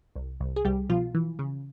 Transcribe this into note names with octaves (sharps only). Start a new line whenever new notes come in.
C2
C2
G#4
C2 G3 G4
B2 F3 F4
E3
C#3